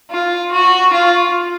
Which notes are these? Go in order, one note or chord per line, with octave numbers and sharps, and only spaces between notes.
F4
F#4
F4